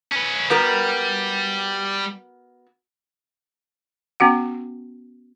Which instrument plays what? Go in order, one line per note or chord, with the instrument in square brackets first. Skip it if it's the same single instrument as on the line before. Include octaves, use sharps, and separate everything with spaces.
[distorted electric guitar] C#4 B4
[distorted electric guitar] G3 [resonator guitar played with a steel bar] B3 F#4 A#4
[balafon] B3 C#4 F#4 F#5